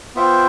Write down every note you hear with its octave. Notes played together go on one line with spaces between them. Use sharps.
B3 F4 C5 E5 G5